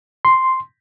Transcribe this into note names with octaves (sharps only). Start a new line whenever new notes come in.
C6